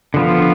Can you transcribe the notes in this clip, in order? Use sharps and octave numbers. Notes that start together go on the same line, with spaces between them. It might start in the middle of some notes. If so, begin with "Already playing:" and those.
D3 F3 B3 F4